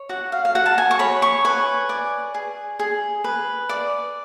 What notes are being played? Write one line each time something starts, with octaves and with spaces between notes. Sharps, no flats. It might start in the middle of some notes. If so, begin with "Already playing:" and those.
Already playing: C#5
F#4 F#5
F5
F5
F#4 F#5
A5
G#5
C#6
C#5 B5
C#6
B4 G#5
D5
G#4
G#4
B4
D5